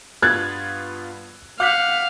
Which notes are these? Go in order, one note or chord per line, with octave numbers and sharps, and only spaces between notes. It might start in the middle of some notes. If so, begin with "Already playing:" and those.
G2 B3 F4 F#6 G#6 A6
F5 F#5 D6 G6 B6